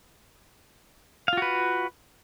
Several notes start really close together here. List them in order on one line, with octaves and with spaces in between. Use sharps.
F5 F4 F#4 B4